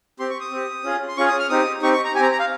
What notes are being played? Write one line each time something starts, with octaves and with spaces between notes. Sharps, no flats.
C4 G4 C6
C#6
D#6
C4 G4
C#4 F4 G#4
C6
C#4 F4 G#4 C#6
D#6
F6
C4 D#4 G4 D#6
C4 D#4 G4 C#6
C#6
A#5
C4 G4 G#5 A#5
A#5
F5